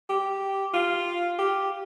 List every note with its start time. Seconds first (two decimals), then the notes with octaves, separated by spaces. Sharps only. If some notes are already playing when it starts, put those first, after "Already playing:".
0.10 G4
0.74 F4
1.39 G4